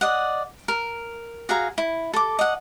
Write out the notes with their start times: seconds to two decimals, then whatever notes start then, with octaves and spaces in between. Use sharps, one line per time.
0.01 D5 D#5 F#5
0.68 A#4
1.49 F#4 G#4 F5 A#5
1.78 E4
2.14 A4 D6
2.39 D#5 F#5